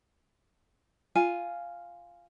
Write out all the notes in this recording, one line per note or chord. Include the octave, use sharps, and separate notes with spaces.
F4 F5 G#5